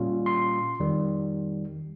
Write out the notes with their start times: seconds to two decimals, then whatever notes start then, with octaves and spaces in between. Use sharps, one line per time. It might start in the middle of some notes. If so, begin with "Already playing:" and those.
Already playing: A#2 G3 C#4 F4
0.26 C6
0.80 F2 D#3 G3